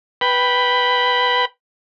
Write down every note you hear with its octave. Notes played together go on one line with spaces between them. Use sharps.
B4 G5 B5